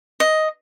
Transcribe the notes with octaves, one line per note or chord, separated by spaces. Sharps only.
D#5